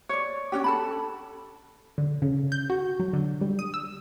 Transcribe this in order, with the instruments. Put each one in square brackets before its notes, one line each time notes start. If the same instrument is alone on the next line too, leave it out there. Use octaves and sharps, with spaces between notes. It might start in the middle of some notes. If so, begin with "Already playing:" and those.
[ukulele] C#5 D5
C#4 D4 G4
A4 A5 B5
[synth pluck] D3
C#3
G6
F#4
F#3
D3
G3
D#6
E6